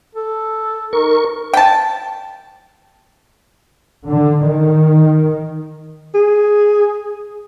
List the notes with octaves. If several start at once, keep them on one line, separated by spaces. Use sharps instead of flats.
A4
D#4 A#4 C#6
G5 A5
D3
D#3
G#4